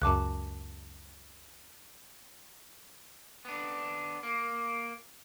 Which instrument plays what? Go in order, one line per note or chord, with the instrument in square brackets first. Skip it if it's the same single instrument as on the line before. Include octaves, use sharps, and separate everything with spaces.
[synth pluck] C#2 F#2 [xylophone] A5 D6 F#6
[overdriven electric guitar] B3 D4
A#3